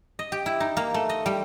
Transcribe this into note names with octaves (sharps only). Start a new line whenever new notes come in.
D#5
G4
E4
D#4
A#3
A3
D#5
G3